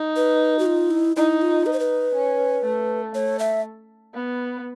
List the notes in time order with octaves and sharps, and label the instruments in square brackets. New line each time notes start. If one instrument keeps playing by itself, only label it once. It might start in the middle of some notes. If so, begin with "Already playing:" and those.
Already playing: [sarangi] D#4
[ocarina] B4
F#4
F4
E4
[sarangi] D#4 [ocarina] E4
[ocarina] F4
[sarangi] D#4 [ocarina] B4
[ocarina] C5
B4
[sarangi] C#4
A3
[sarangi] A3 [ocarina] C#5
[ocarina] E5
[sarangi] B3